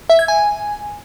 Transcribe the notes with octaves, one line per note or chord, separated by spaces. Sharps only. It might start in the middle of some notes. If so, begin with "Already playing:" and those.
E5
G#6
G#5